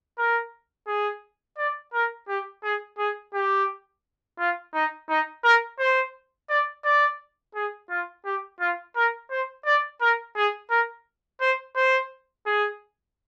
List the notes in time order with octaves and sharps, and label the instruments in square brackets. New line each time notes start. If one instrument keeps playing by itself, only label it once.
[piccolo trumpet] A#4
G#4
D5
A#4
G4
G#4
G#4
G4
F4
D#4
D#4
A#4
C5
D5
D5
G#4
F4
G4
F4
A#4
C5
D5
A#4
G#4
A#4
C5
C5
G#4